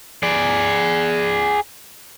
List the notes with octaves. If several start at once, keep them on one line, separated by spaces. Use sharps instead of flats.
G#4 D5